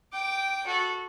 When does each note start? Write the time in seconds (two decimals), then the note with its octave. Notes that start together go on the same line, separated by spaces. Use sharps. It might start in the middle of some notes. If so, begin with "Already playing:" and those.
0.13 G5 D6
0.67 F#4 A4